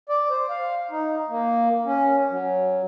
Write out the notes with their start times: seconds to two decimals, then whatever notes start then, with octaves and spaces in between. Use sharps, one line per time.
0.09 D5
0.30 C5
0.49 F5
0.91 D#4
1.29 A#3
1.85 C#4
2.30 F#3